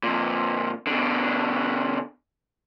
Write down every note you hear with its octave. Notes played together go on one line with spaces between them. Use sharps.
F2 A#2
B2 D3